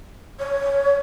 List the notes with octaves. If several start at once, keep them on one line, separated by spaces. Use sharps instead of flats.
C#5